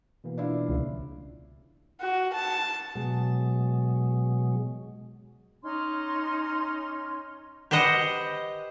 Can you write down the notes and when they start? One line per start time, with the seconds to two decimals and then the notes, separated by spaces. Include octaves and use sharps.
0.24 B2 E3 A#3
0.38 D4 E4 F4
0.69 C#2
2.01 F#4
2.33 A5
2.95 B2 F#3 G#3
5.62 C#4 D#4 C6
7.71 G4 B4 C5 D#5 F#5